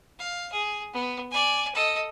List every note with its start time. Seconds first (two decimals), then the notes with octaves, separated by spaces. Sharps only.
0.19 F5
0.52 G#4
0.93 B3
1.31 D5 G#5
1.74 A4 D#5